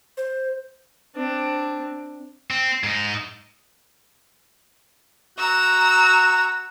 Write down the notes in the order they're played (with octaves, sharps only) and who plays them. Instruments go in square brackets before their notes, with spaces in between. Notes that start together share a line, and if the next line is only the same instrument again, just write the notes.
[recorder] C5
[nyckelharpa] C4 D4
[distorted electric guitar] C4
G#2 D#4
[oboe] F#4 [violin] A#5 E6